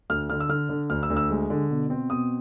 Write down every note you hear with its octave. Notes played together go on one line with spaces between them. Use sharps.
D2 F6
D3 F6
E6
D3 F6
D3
D2 F6
E6
D2
E6
G#3
D3
B2
C4
B2 D#6